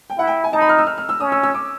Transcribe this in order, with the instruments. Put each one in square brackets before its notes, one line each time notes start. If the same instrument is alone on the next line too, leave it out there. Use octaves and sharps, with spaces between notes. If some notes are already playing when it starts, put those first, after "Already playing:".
[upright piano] G5
[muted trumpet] E4 [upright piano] F#5
[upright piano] G5
G#5
[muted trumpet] D#4 [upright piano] A5
[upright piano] B5
F6
E6
F6
F6
E6
[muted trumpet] C#4 [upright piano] D#6
[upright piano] E6
E6
D6